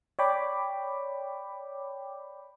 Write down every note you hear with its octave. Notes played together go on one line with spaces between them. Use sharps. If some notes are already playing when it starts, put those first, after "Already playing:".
C#5 D5 G5 B5 D6